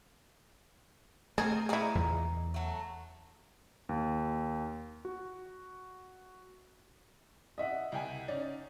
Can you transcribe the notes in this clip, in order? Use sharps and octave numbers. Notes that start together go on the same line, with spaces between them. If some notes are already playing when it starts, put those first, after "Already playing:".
A3 C4 D#4 G#4 A#4
A#2 D#4 E4 G#4 D5
E2
F#3 A3
D#2
F#4
D#5 E5 F#5
C2 G5 G#5
C#4 D#4 D5